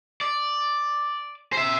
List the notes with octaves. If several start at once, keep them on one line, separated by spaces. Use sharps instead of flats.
D5
C5 E5